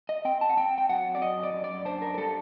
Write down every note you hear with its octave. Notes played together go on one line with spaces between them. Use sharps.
D#5
C4 G5
A5
F#5
C4 G5
G5
F#3 F#5
D5
F#2 D#5
D5
F#2
D5
D4 C5
A#4
A#4
G3 A4